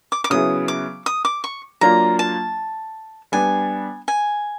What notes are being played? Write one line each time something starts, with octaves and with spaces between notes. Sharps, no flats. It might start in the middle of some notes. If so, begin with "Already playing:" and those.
D6
D6
C#3 F#3 B3 E4 G#4 D#6
D6
D#6
D6
C#6
F#3 A#3 D4 F4 A#5
A5
G3 B3 D4 G#5
G#5